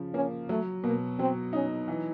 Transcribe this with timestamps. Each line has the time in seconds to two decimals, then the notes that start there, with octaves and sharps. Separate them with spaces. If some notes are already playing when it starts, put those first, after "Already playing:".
Already playing: C#3 F3
0.14 A#3 C#4
0.49 F#3 A3
0.84 B2 A#3
1.19 F#3 C4
1.53 C#4 D#4
1.88 E3